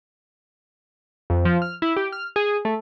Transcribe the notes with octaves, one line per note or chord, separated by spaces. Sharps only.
F2
F3
F6
E4
G4
F6
G#4
A3